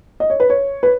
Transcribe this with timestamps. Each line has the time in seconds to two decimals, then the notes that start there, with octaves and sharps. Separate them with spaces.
0.20 D#5
0.30 C#5
0.40 B4
0.50 C#5
0.83 B4